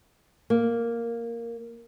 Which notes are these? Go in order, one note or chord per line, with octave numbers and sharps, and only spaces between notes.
A#3